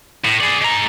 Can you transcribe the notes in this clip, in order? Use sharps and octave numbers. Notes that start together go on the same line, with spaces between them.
A2
G#4 D5
G#3 A#5